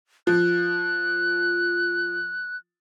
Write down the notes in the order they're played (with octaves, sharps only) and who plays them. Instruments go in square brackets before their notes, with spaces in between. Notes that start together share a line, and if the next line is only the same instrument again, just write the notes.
[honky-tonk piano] F3 [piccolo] F#6